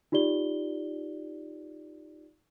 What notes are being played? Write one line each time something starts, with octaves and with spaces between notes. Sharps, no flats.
D#4 F4 G4 D5 G7